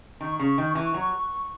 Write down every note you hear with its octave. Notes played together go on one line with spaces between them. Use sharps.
D#3 C#6
C#3
D#3
E3
F#3